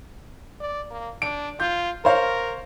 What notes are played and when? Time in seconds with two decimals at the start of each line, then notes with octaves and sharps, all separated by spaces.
0.60 D5
0.91 A#3
1.22 D4 D7
1.60 F4 G6
2.05 A#4 C5 C#5 F5